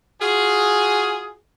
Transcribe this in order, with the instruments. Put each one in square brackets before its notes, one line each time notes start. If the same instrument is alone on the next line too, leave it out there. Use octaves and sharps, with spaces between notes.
[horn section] F4 F#4 G#4